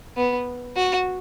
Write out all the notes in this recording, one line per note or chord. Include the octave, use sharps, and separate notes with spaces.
B3
F#4